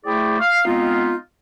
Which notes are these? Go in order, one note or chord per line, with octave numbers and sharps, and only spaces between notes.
A3 E4 G#4 C5 D5 G5
F5
G#3 B3 C4 D#4 F4